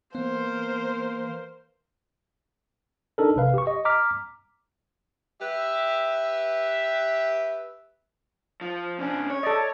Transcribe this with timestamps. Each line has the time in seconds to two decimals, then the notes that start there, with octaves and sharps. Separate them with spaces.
0.15 E3 A#3 B3 A#4 C5
3.18 D4 D#4 A4 A#4
3.36 A1 C3 B4 F5
3.54 G4 C#6
3.67 D#5
3.85 A#5 D6 F6 B6
5.41 G4 B4 E5
8.61 F3
8.99 C3 C#4 D4
9.30 C#5
9.43 A4 D5 D#5